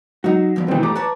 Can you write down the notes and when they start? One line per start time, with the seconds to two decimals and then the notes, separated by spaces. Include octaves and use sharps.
0.24 F#3 D#4 F#4
0.56 E2 G2 F3
0.68 B2 D#3 E3 C4
0.83 A2 G4 A4 A#5 D6
0.95 B4 C#5 A5